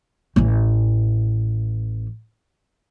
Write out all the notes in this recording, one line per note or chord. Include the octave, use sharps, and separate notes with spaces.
A1 E3